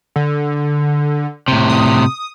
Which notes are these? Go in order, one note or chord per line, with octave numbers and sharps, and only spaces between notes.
D3
A2 C3
D#6